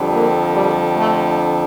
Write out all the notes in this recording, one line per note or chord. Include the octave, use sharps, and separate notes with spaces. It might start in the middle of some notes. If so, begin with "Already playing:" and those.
Already playing: F2 D3 G3
A#3
G3
A3